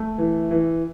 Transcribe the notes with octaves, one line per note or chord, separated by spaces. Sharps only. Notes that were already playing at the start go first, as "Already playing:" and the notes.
Already playing: A3
E3
E3